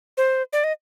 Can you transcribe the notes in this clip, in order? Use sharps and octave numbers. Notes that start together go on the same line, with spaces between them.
C5
D5
D#5